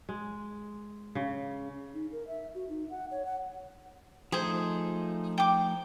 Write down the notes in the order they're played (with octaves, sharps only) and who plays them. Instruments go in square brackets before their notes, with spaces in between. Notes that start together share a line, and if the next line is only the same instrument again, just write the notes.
[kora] G#3
C#3
[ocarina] D#4
A#4
E5
F#4
D#4
F#5
C#5
F#5
[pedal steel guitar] F3 A3 D#4 [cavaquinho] G#4 C5
[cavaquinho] G5 D6